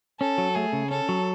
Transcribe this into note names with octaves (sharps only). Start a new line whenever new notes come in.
C#4 A4
F#3
A3 G#4
C#3
C#4 A4
F#3